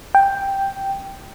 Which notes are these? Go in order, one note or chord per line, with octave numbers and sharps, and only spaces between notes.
G5